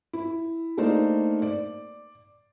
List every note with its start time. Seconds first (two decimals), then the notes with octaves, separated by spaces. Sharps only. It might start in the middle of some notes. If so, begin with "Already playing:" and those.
0.13 E4
0.77 A3 A#3 D4 D#4 C5
1.42 D5